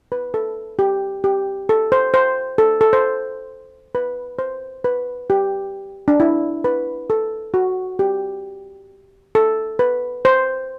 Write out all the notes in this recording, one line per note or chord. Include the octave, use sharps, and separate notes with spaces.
B4
A4
G4
G4
A4
C5
C5
A4
A4
C5
B4
C5
B4
G4
D4
E4
B4
A4
F#4
G4
A4
B4
C5